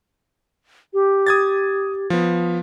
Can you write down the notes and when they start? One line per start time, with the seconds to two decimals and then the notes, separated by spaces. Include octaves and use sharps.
0.94 G4
1.27 D#6 G#6 A6
2.10 F3 B3